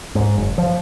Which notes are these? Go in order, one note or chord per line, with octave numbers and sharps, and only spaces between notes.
G#2
F#1
F3